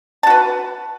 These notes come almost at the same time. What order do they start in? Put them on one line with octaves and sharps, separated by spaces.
A5 F#4 B4